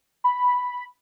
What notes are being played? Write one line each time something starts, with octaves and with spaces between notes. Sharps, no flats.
B5